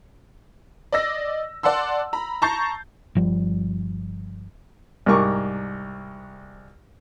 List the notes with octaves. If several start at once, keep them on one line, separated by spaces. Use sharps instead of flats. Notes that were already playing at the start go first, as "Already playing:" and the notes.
D5 D#5 E6 A#6
D5 F#5 A5 C6 E6
A#5 B5
A5 A#5 C#6 G6 A6 C7
G1 F3 G3
C2 G#2 A#4 C#6 D6